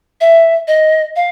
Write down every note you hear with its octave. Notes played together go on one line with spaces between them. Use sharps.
E5
D#5
F5